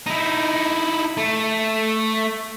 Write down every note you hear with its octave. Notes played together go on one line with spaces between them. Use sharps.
D#4 E4
A3